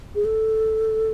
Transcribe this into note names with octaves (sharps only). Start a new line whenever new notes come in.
G#4
A4